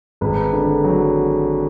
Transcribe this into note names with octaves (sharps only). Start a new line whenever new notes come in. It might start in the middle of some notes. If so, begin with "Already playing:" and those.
G#1 B4
D3
F#3